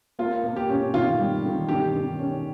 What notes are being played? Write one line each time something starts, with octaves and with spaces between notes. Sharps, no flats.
A#3 F4
A#3
G4
C#4
D#3 F4
G3
D#3
D#3 G4
D#3
C#4